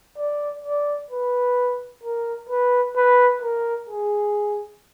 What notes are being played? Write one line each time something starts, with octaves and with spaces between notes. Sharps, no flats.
D5
D5
B4
A#4
B4
B4
A#4
G#4